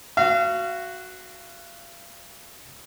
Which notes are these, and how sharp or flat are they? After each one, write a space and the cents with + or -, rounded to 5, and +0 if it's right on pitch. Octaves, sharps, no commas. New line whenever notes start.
F#4 +0 F5 -35